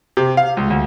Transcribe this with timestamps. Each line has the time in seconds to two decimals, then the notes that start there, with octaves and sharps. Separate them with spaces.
0.17 C3
0.37 F5
0.57 C#2
0.70 D2